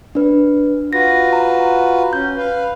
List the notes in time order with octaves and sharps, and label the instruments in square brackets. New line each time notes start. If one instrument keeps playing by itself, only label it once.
[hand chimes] D4 B4
[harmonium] F4 F#4 B4 [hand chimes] A#6
[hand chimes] A#5
[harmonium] C#4 [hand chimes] G6
[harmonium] B4 F5